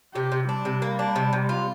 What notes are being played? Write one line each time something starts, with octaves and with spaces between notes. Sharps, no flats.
C3 G4
C3
G3 D4
C3
A#3
D4
C3
C3
F4